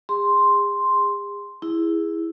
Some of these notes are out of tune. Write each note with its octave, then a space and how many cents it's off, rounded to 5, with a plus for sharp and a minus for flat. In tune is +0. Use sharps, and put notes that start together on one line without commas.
G#4 -35 C6 +0
E4 +0 G#4 -15